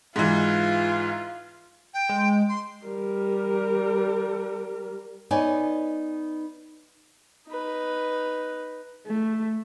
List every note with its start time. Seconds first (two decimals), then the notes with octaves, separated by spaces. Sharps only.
0.16 G#2 E3 F4
1.94 G5
2.09 G#3
2.49 C6
2.85 G3 A#4
5.31 B3 D#4 C#5 D5 G#5
7.48 D#4 B4
9.07 A3